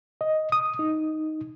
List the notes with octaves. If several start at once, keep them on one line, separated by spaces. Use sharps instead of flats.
D#5
D#6
D#4